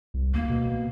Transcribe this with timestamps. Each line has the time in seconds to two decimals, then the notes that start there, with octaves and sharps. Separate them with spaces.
0.14 C2
0.34 D2 A#3
0.50 B2